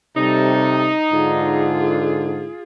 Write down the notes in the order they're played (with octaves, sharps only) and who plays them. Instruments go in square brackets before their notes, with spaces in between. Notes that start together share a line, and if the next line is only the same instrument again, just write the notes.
[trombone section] C3 [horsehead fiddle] G3 A4 [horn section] D#4
[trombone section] G#2 D3 [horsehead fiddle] F4 G#4